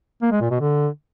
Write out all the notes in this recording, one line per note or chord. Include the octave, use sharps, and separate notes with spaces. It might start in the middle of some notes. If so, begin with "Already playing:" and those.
A#3
G#3
A#2
B2
D3